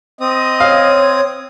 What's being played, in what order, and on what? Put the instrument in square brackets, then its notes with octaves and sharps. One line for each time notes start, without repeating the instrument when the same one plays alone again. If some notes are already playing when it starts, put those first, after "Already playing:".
[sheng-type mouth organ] C4 D#6 [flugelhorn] D#5
[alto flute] C#5 [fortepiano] F5